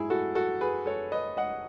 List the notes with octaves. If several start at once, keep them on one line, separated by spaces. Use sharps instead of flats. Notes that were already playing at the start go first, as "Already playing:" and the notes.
Already playing: G#2 F#3 E4 G#4
F#4 A4
F#4 A4
G#4 B4
A4 C#5
B4 D#5
D#5 F#5